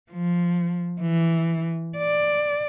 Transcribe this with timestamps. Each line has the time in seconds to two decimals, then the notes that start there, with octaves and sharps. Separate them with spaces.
0.12 F3
1.01 E3
1.98 D5